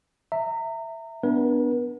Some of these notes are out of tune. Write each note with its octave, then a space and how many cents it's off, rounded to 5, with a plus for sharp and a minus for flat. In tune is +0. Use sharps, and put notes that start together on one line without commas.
E5 +0 A#5 -30
B3 +0 D4 +0 B4 -45